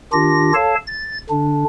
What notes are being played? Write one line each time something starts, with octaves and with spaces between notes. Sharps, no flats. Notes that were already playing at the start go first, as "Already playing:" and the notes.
D#3 D4 F4 G4 A#6
A4 C#5 F5 A5
A6
D3 D4